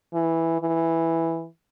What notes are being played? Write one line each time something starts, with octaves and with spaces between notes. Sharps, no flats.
E3
E3